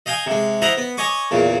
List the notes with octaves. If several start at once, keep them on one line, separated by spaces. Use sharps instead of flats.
D#5 F5 G5 G#5
C3 G#3
E4 C5 D#5 F#5 A#5
B3
C#5 D#5 G#5 C#6 D6
E2 A#2 C#3